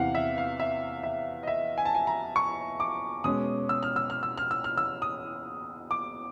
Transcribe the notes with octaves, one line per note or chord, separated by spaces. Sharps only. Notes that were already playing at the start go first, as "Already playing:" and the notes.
Already playing: E2 C3 E3 F5 F#5
E5
F5
E5
E5
D#5
E5
G#5
A5
G#5
A#5
C#6
D6
B2 G#3 C#4 D#6
E6
F6
E6
F6
E6
F6
E6
F6
E6
D#6
D6